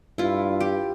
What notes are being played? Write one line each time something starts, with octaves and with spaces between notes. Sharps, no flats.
G2 E4 F4
G4